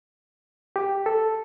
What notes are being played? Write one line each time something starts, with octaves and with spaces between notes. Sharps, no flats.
G4
A4